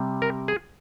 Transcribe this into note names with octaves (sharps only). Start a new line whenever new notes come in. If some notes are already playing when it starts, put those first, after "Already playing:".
Already playing: C3 G3
A#4
G#4